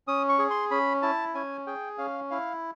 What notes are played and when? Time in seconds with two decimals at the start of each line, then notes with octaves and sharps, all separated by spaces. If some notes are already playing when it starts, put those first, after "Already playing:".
0.08 C#4 D#6
0.29 C#6
0.39 G#4
0.50 C6
0.71 C#4 B5
1.02 E4 A5
1.35 C#4 G#5
1.67 G#4 G5
1.98 C#4 F5
2.31 E4 F5